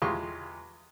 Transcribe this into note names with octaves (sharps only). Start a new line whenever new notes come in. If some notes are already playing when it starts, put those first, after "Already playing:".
E2 G#3 F4 G4 C6 C#6